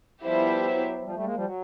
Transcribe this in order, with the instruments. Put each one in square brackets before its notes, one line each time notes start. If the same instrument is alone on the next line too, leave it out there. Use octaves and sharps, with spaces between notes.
[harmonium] F3 G3 [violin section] B3 E4 G4 C5 E5
[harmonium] F#3
F#3
F3 G3
G3 A3
G#3 A#3
F3 G3
F#3